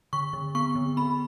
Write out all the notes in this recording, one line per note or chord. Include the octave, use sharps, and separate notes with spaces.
D3 C#6
D3
B3 C#6
D3
B3 B5